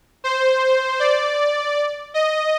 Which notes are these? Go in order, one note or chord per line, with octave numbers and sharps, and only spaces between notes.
C5
D5
D#5